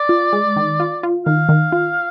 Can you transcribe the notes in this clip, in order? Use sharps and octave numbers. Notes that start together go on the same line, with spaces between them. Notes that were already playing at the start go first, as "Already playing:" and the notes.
Already playing: D5
F4
G#3
D#3
F4
F4
D#3 F5
D#3
F4